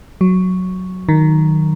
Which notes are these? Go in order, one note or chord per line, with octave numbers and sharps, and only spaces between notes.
F#3
D#3